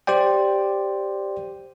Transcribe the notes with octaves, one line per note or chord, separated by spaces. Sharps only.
G4 C5 D5 G5